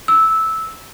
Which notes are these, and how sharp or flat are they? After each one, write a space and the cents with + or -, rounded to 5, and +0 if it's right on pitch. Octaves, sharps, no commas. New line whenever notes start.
E6 -10